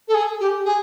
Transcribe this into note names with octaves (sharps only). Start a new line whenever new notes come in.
A4
G#4
G4
G#4